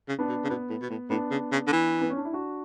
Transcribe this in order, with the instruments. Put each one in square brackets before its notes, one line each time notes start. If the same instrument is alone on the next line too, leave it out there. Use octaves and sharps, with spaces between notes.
[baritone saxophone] C#3
[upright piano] B3 D4
[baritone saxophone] B2
C#3
[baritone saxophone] B2 [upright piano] B3
[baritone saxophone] A2
B2
A2
[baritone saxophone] A2 [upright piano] B3 D4
[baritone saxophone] C#3
C#3
D3
E3
[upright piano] B3
C#4
D4
E4
D4 F#4